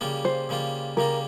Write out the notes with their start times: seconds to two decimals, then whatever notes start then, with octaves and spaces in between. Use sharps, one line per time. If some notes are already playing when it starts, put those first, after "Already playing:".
0.01 C#3 G3 A#3 F4
0.25 C5
0.49 C#3 G3 A#3 F4
0.97 C#3 G3 A#3 F4 A#4